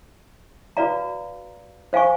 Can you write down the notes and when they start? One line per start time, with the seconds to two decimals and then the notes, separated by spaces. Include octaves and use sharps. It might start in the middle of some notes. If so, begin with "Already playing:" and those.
0.77 F#4 B4 D5 F5 A#5
1.93 C5 F5 G#5 C#6